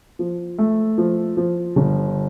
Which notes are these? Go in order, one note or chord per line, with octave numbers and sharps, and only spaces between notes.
F3
A3
F3
F3
G1